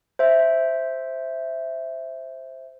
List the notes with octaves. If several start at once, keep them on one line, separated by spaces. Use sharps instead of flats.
C5 E5